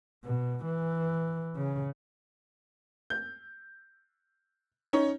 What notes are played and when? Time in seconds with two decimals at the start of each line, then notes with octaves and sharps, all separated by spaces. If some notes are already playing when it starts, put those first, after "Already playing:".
0.25 B2
0.65 E3
1.56 C#3
3.10 G6
4.93 C#4 D#4 C#5